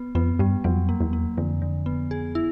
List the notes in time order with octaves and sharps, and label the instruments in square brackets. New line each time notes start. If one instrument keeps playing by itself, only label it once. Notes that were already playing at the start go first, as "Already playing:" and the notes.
Already playing: [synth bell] B3
[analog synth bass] F2 [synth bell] B3
[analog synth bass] G2 [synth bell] G3
[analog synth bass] F2 [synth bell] F#3
[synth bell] A#3
[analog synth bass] E2
[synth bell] A#3
[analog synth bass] F2 [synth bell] D3
[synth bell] D3
B3
G#4
E4